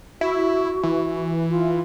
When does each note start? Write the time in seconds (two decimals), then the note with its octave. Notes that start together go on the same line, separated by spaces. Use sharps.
0.21 E4 F#4
0.83 E3
1.50 F4